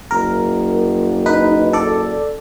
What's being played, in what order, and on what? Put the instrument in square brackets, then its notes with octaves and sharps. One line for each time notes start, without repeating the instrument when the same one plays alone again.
[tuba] F#1 [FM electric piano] A#4
[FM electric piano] D#4 B4
A4 D5